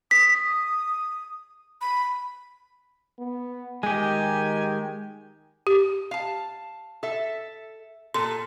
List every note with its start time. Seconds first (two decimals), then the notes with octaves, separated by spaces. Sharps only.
0.11 D#6 B6
1.81 B5
3.19 B3
3.83 D#3 G#3 G4 G#5
5.67 G4
6.11 F5 A5
7.03 A4 E5
8.14 A#2 A4 C6